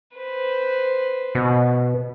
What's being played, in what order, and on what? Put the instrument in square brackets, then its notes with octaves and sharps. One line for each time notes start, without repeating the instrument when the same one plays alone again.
[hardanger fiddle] B4 C5
[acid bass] B2